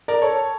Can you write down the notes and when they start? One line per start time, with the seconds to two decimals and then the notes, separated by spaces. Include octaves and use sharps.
0.08 A#4 D5
0.22 A4 C#5